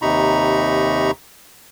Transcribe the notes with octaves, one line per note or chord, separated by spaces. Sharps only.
D#2 C3 D#4 A#5 B5 C#6